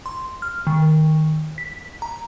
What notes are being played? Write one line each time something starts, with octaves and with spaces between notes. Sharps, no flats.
C6
F6
D#3
B6
A#5